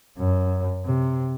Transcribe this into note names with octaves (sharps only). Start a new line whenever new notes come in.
F#2
C3